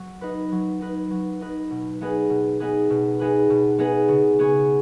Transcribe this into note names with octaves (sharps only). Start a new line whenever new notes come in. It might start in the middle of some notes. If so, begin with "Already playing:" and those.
Already playing: F#3
D#4 B4
F#3
D#4 B4
F#3
D#4 B4
B2
B3 D#4 G#4 B4
B2
B3 D#4 G#4 B4
B2
B3 D#4 G#4 B4
B2
B3 D#4 G#4 B4
C#3
B3 G#4 C#5